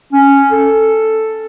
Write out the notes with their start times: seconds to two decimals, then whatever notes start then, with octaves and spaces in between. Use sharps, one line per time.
0.13 C#4
0.51 A4